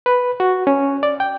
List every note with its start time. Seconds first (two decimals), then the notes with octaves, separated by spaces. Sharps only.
0.06 B4
0.40 F#4
0.67 C#4
1.03 D5
1.20 G5